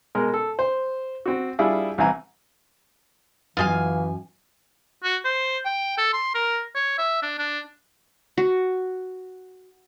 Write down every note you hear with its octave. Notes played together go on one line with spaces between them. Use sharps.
B2 G#3 A#4
A4
C5
C4 F#4
G3 D4 E4 F4 G#4
C2 E3 C4 E4 G#5 A#5
F#2 E3 F4 D#5 F5 G#5
F#4
C5
G5
A4
C6
A#4
C#5
E5
D4
D4
F#4